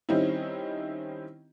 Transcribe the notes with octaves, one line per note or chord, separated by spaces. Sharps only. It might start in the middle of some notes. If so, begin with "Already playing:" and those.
D#3 G3 C4 C#4 D#4 E4